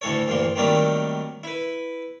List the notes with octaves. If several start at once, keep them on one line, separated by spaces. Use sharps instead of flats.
D2 A2 E3 A4 C#5
D2 G2 A#2 E3 C6
D#3 F#3 G3 A3 A#3 C4
E4 B4